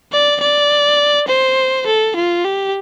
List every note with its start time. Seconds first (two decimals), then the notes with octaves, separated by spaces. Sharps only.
0.12 D5
0.40 D5
1.28 C5
1.86 A4
2.16 F4
2.45 G4